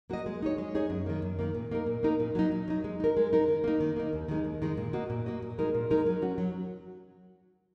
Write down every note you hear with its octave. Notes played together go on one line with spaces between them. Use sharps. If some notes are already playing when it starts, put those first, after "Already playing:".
A#3 F#4 D#5
G#3
D#4 G#4 C#5
G#3
D#4 G#4 C#5
F#2
D#3 A#3
F#2
D#3 A#3
A#2
A#3 D#4 A#4
A#2
A#3 D#4 A#4
A#2
F#3 D#4
A#2
F#3 D#4
G#3
D#4 A#4
G#3
D#4 A#4
D#3
A#3 D#4
D#3
A#3 D#4
D#2
D#3 G#3 D#4
D#2
D#3 G#3 D#4
A#2
A#3 F#4 D#5
A#2
A#3 F#4 D#5
A#2
G#3 D#4 A#4
A#2
G#3 D#4 A#4
F#3
C#4 F#4
F#3